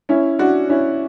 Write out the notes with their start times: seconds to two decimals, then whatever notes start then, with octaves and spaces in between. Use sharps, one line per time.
0.09 C#4 E4
0.39 D4 F#4
0.69 C#4 E4